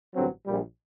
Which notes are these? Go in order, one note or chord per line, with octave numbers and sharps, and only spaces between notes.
A1 G2 D3 F#3 C4
A#1 A#2 G3